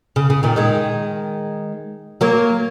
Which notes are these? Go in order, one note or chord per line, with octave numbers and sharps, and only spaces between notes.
C#3
C#3
A#2 D#3
D#3 G#3
F#3 A#3